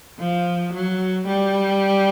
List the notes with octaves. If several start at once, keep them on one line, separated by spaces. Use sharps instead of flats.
F3
F#3
G3